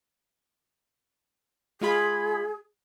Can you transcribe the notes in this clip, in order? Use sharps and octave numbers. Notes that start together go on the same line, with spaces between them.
G#3 F4 G#4 B5